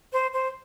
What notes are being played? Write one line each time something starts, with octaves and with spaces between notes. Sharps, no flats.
C5
C5